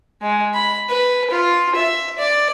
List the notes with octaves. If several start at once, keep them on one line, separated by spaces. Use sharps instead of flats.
G#3
B5
B4
F4
E5
D5